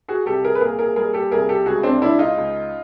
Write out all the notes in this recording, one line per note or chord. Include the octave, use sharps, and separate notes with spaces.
F#4 G#4
C2 G4 A4
G#4 A#4
B4
A#2 G#4 A#4
G#4 A#4
G3 G#4 A#4
G4 A4
C2 G#4 A#4
G4 A4
C#2 F#4 G#4
C4 D4
C#2 D4 E4
D#4 F4
C#2